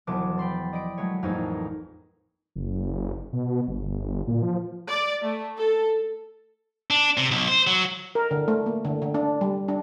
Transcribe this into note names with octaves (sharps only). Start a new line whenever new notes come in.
E1 F3 F#3 B3 A5 D6
G5 B5 C6 A6
D5 D#5 B5 B6 D7
F#3 G#3 A3 C#5
A1 F2 A#3 D#4 G#4
F#1
B2
G1
A#2
F3
D5
A3
A4
D4
C3
B1
C5
F#3
A#4
D3
A3
A#3
D3
D3
D4
G3
D4